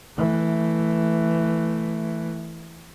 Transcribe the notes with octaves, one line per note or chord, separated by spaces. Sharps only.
E3 A3